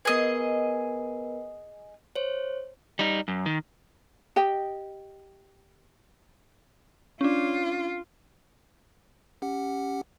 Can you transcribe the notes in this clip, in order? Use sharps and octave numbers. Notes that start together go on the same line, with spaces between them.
B3 G#4 A#4 B4 D#5
C5 C#5
G3 D#4
F#2
D#3
G4 D#5 G5
C#4 D4 F4
C#4 G4 F#5